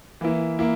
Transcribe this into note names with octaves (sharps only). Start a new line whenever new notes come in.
E3 A#3 E4
A#3 E4